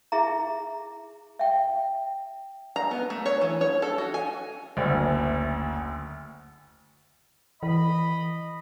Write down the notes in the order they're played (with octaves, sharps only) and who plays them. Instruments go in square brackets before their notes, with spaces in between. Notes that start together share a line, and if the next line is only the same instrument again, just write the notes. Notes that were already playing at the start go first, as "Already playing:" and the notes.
[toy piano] E4 G#4 E5 A#5
E5 G5
[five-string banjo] A#5
B3
A3
C#5
E3
C#5
A4
F#4
G#5
[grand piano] F#1 D2
[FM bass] E3 [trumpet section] D#5 B5